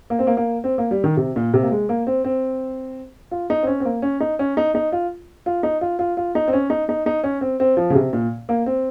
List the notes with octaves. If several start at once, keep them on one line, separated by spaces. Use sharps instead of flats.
A#3
C4
A#3
A#3
C4
A#3
G3
D#3
C3
A#2
C3
A#3
G#3
A#3
C4
C4
F4
D#4
C4
C#4
C4
A#3
C#4
D#4
C#4
D#4
D#4
F4
F4
D#4
F4
F4
F4
D#4
C4
C#4
D#4
D#4
D#4
C#4
C4
C4
F3
C#3
C3
A#2
A#3
C4